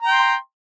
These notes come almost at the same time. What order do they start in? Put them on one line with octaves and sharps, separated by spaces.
A#5 G5 C6